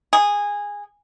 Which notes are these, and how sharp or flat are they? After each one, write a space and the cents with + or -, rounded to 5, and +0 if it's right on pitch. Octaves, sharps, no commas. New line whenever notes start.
G#4 -15